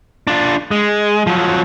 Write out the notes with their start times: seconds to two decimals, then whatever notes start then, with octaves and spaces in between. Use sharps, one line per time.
0.27 D4 F4
0.71 G#3
1.27 F3 F#3